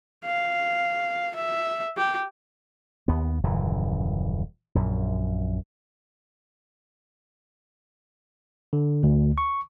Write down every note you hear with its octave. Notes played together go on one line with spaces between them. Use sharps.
F5
E5
G4
D#2 B3
D#1 F#2 C#3 E3
A#1 F#2
D3
D2
C#6